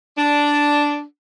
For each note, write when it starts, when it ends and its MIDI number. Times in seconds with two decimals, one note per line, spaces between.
0.17 1.03 62